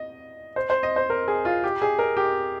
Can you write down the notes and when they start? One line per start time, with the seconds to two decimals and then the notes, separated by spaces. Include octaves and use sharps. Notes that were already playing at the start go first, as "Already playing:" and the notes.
Already playing: D#5
0.56 C5
0.70 C5
0.83 D#5
0.96 C5
1.10 A#4
1.28 G#4
1.45 F4
1.64 G4
1.82 G#4
1.99 A#4
2.17 G4